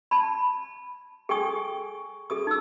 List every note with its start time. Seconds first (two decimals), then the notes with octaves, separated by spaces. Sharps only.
0.11 A5 B5
1.29 G#4 A4 G5 G#5 C#6 D#6
2.30 G#4 A4 D#6
2.47 D#4 E6